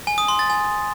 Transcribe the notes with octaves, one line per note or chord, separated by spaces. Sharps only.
G#5
D#6
C6
A6
G#5